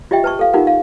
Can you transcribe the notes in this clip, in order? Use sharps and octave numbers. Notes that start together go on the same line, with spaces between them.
F4 G4 D#5 E5 G5
B4 A5 C#6
A4 F5
D#4 F4 G4 A#4 F#5
F5